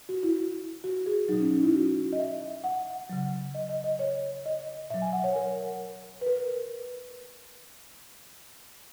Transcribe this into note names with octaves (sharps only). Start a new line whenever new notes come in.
F#4
E4
F#4
G#4
B2 F#3 D#4
C#4
D#4
E4
F#4
D#5
E5
F#5
C#3 F#3
D#5
D#5
D#5
C#5
D#5
B2 F#3 E5
G#5
F#5
C#5
A#4
B4
A#4